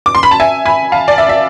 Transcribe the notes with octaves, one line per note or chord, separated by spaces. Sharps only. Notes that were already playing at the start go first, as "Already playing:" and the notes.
D6
C6
B5
A5
E5 G#5
G#5 B5
F5 A5
D5
E5
E5